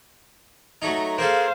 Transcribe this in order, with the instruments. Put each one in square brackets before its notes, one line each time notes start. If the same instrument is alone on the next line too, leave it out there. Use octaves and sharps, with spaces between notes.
[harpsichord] F#3 A3 D#4
[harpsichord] A#3 G#4 A4 [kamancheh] C5 F5